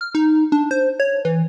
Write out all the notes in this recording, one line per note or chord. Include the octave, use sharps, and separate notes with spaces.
F6
D#4
D4
C5
C#5
E3